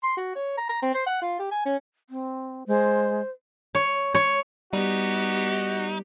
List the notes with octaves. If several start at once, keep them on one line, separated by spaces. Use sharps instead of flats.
C6
F#4
C#5
A#5
A#5
C4
C5
F#5
F4
G4
G#5
C#4
C4
G#3 C5
C#5
C#5
G3 B3 D#4 F#4 G4